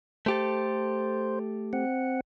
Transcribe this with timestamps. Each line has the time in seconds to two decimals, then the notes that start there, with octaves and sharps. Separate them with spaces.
0.26 A3 G4 A4 C5
1.73 C4 F#5